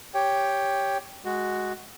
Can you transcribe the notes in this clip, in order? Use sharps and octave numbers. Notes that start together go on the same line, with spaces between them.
G4 C#5 G5
G#3 F#4